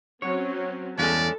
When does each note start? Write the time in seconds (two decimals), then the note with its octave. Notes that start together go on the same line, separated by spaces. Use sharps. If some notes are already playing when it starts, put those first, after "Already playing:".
0.22 F#3 C4 C#4 C#5
0.98 E2 G2 G#3 C#4 A4 D5 A5